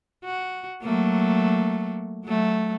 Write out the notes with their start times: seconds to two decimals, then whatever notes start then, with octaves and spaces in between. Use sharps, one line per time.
0.25 F#4
0.82 F#3 A3 A#3
2.25 F#3 A3